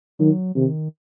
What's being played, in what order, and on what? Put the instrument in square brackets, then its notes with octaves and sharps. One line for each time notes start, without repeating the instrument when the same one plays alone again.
[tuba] D#3 [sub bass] F#3
[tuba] C3 [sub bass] D#3